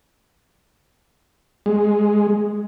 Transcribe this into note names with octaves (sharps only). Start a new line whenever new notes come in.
G#3